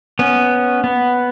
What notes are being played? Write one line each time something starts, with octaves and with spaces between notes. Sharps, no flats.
B3 C#4
B3